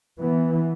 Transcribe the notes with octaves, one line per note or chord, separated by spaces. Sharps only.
E3 B3